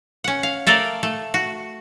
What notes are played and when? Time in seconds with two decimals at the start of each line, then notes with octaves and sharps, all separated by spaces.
0.24 C#4 F#5
0.43 F5
0.67 A3 A4 A#4 D5 F5
1.03 A3
1.34 F#4